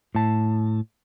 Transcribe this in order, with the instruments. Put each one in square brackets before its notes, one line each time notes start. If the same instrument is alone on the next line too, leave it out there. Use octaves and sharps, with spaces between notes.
[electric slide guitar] A2 A5